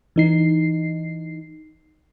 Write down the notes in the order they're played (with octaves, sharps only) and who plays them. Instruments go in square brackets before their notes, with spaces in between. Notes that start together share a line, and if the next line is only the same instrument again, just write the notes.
[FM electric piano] E3 D#4 C7